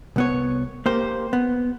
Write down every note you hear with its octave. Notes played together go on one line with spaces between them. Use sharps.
C2 B3 C#5
A#3 G4 C5
B3